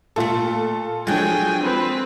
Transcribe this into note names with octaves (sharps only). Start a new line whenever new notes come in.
A#2 A3 F4 A4
D3 F3 F#3 G#3 G5 G#5
C4 B4